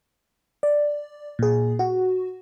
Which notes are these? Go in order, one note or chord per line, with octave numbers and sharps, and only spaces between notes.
D5
A#2 G#4
F#4